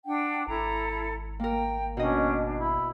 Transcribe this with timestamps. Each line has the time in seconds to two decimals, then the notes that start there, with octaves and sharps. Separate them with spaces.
0.05 D4 F#5 G5
0.47 G#1 E4 A4 A#5
1.40 A#3 A#4 G5
1.97 B2 C#4 D4 D#5
2.58 E4